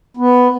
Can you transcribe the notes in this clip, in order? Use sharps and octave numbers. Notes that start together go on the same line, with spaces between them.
B3